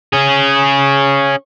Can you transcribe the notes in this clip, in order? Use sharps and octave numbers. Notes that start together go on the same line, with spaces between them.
C#4 G#4